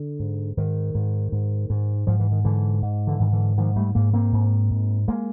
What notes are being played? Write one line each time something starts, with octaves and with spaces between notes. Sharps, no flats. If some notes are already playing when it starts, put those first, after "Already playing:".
Already playing: D3
G#2
G#2 D#3
G#2
G#2
G#2
G#2 F3
E3
D#3
G#2 D3 E3
G#2
D3 E3
G#2 D#3
D3 E3
G#2 D#3 F3
G3 A3
G#2 G#3 A#3
A#3 C4
G#2
G#2
G#3 A#3